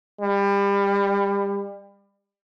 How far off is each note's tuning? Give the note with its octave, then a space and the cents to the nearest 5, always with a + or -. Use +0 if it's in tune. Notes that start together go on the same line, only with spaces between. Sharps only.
G3 +30